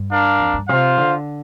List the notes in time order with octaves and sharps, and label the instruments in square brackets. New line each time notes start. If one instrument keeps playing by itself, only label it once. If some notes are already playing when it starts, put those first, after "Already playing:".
Already playing: [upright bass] G2
[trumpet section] D4 A#4 F5
[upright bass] F2
G2
[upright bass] C3 [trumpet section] F4 C5 F5
[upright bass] D3